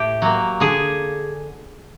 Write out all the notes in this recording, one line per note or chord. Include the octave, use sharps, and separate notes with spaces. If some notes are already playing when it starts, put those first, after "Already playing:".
Already playing: A2 G4
F#3 A#3
D3 G#4